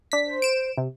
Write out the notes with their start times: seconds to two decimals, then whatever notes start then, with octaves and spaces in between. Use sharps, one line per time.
0.12 D4 B6
0.26 C5
0.42 D7 E7
0.78 C3